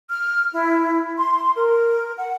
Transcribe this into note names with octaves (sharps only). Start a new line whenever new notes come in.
F6
E4
C6
A#4
F#5